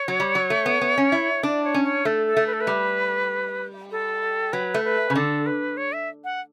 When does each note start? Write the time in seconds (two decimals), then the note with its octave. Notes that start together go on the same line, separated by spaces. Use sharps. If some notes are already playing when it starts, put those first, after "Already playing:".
Already playing: C#5
0.08 F#3
0.20 G3
0.35 F#3
0.50 A3
0.66 B3
0.81 B3
0.98 C#4
1.12 E4
1.43 D4 D5
1.64 C#5
1.74 C#4
1.84 C#5
2.05 A3 A4
2.27 A4
2.37 A3
2.47 B4
2.53 A4
2.61 B4
2.67 G3
3.91 A4
4.53 F#3 B4
4.74 A3
4.84 B4
5.10 C#3
5.15 D3 A4
5.46 B4
5.77 C#5
5.93 E5
6.24 F#5